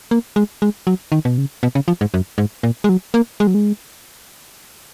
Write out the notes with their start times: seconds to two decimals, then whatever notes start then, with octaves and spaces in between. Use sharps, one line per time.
0.11 A#3
0.36 G#3
0.62 G#3
0.87 F#3
1.12 D#3
1.25 B2
1.38 C#3
1.63 B2
1.75 C#3
1.88 F3
2.01 G#2
2.14 F#2
2.38 G#2
2.63 A#2
2.84 G#3
2.89 F#3
3.14 A#3
3.40 G#3
3.47 F#3
3.54 G#3